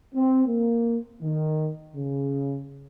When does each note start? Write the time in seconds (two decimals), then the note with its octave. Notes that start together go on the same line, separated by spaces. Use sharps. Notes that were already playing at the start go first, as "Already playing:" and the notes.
0.14 C4
0.47 A#3
1.22 D#3
1.96 C#3